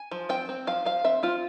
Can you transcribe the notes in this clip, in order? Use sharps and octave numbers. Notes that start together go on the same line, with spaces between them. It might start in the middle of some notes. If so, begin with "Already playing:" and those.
Already playing: G#5
F3
C4 G5
C4
F3 F5
F3 F5
C4 E5
C4 F4